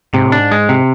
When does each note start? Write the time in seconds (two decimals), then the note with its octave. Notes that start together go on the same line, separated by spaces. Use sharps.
0.13 G#2 C3
0.26 A2
0.32 D4
0.38 G#2
0.51 G#3
0.69 C3